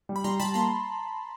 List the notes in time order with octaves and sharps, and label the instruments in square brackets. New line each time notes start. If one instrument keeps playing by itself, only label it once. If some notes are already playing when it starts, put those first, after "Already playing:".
[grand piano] G3
[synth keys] B5
[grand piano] G3 [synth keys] A#5 C6
[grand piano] G3 [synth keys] A5 B5
[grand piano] A#3 [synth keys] A#5 C6